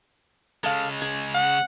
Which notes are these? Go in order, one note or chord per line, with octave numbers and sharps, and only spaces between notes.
C#3 G#3 A4 F5
G#4
F#5